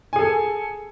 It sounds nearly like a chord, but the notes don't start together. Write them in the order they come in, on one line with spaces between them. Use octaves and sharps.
G#5 G#4 A4